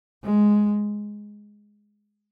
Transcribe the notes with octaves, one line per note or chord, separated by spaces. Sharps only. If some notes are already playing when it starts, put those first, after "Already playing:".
G#3